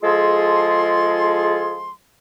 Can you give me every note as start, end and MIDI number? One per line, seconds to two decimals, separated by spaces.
0.03 1.91 53
0.03 1.91 56
0.03 1.91 65
0.03 1.91 68
0.03 1.91 69
0.03 1.91 84